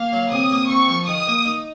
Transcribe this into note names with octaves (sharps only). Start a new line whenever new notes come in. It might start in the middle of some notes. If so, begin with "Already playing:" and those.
Already playing: A#3 F5
F#3
C3 D#6
A#3
C4 C#6
F3
D#3 D#6
A#3
D#4